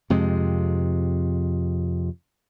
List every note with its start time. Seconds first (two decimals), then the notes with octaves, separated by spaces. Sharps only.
0.10 F2 C3 G#3